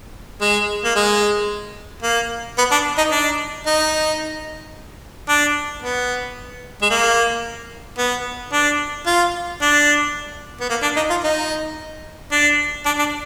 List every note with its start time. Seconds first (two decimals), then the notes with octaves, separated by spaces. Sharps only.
0.41 G#3
0.84 A#3
0.95 G#3
2.03 A#3
2.58 B3
2.72 D4
2.97 D#4
3.11 D4
3.66 D#4
5.29 D4
5.82 B3
6.82 G#3
6.91 A#3
7.98 B3
8.53 D4
9.06 F4
9.61 D4
10.60 B3
10.70 A#3
10.83 D4
10.96 D#4
11.10 F4
11.24 D#4
12.32 D4
12.86 D4
12.99 D4